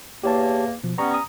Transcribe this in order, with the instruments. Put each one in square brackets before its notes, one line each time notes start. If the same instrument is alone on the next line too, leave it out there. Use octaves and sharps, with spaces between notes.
[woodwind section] E2 A#3 [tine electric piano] G4 C#5 A5
[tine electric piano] B2 F3
[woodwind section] G3 B3 C#4 [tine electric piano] A#5 C#6
[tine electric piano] A#5 D#6